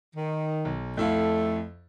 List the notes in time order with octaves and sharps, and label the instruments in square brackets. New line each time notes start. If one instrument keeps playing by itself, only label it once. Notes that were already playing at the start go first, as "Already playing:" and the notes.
[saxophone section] D#3
[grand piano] B1
[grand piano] F2 E4 F5 [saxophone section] A3